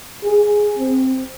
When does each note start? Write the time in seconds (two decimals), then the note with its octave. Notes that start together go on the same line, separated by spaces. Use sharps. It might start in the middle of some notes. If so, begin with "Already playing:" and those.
0.24 G#4
0.78 C4